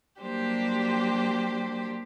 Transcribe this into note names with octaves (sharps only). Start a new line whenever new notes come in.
F#3 G3 A#3 D4 G4 C5